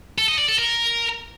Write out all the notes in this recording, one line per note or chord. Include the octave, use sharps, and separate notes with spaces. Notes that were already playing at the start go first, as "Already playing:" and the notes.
A4
D#5
D5
A4
A#4